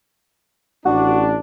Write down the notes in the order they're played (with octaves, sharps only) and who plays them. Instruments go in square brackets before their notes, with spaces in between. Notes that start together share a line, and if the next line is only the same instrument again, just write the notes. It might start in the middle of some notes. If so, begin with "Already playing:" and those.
[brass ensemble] A1 D4 [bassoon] F#4